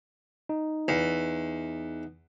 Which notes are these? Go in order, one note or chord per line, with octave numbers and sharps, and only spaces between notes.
D#4
E2